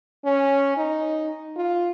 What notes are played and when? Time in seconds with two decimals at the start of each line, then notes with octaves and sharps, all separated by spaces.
0.25 C#4
0.77 D#4
1.56 F4